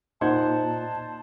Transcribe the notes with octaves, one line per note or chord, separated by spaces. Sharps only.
A#2 D#4 C5 F#5 A5 G#6